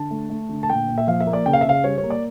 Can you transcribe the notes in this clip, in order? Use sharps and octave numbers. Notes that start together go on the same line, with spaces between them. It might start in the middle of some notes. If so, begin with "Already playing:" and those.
Already playing: D3 A5
A3
A3
D3
A5
A#2 G5
A#2
E5
F3 F5
E5
A#3
D5
C#3 G5
F5
E5
C#3 F5
G3 C#5
C#5
A#3
D5